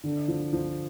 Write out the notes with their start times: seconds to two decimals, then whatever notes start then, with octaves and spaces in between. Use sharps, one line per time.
0.04 D3
0.28 F3
0.53 F3